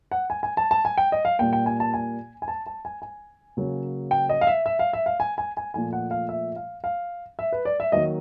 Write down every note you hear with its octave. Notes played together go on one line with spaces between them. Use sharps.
F#5
G#5
G#5
A5
A5
G#5
G5
D#5
F5
A#2 G3 A#3 G5
G5
G#5
A5
G#5
G#5
A5
A5
G#5
G#5
C#3 F#3 A#3
G5
D#5
F5
E5
E5
F5
E5
F5
G#5
G#5
G#5
A#2 F3 A3 G#5
F#5
F5
E5
F5
F5
E5
B4
D5
E5
D#3 F#3 A#3 D#5